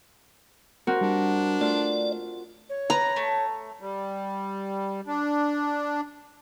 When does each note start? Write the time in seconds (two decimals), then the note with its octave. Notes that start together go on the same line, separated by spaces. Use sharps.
0.87 C4 F#4 A#4
1.01 G3 D4
1.61 A3 F4 D5
2.70 C#5
2.90 B4 A#5
3.16 A3
3.80 G3
5.07 D4